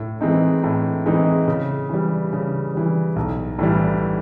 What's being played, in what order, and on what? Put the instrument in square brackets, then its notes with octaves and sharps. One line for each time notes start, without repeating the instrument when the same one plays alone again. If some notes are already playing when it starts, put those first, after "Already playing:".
Already playing: [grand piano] A2
E3 G#3 C4 D#4
A2
E3 G#3 C4 D#4
C#3
E3 G3
C#3
E3 G3
B1
A2 E3 G3